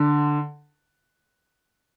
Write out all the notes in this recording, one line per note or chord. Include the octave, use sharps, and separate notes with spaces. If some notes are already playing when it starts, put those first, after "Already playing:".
Already playing: D3